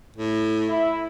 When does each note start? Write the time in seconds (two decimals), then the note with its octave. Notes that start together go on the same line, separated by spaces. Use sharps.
0.16 A2
0.69 E4